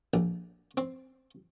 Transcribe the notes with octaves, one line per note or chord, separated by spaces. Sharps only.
A#1
C4